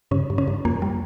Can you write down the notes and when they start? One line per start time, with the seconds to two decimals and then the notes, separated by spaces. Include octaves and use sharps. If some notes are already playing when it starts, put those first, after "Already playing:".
0.11 G2 C#3 C#4
0.30 G2
0.38 C#3 C#4
0.48 G2
0.65 F2 A#3
0.82 G3